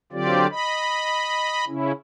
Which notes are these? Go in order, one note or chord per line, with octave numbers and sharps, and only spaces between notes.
D3 F#3 C4 F4 G4 D5
D#5 B5
C#3 C#4 E4